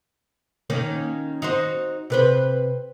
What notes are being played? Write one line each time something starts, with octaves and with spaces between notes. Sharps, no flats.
D#3 A#3 C#4
D#4 F#4 C5
C3 B4 C5